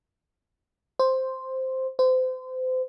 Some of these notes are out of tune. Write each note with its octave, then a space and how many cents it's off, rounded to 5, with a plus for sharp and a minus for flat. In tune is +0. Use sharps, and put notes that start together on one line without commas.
C5 +0
C5 -30